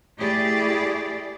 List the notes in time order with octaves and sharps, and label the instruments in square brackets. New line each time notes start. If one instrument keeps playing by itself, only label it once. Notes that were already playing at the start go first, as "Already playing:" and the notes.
[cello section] A3 E4 G4 G#4 D5